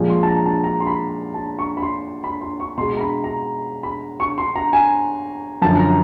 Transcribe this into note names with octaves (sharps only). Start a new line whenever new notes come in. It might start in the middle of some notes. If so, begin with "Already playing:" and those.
Already playing: A#2 F3 G#3
C6
A5
A#5
A5
A#5
C6
B5
A5
C#6
B5
C6
B5
C6
C#6
B2 G#3 C6
A#5
B5
A#5
B5
C#6
C6
A#5
G#5
F#2 D3 F3 A5
A#5